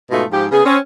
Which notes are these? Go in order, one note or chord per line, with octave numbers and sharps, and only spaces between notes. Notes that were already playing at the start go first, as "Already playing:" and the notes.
G#2 B2 A3 D#4 F4
G#2 F3 G4
C#3 B3 G#4
C4 C#4